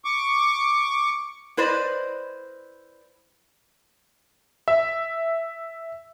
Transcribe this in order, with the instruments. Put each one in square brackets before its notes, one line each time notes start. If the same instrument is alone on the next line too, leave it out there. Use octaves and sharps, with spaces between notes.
[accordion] C#6 D6
[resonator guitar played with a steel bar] E4 B4 C5 D5 D#5
[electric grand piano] E5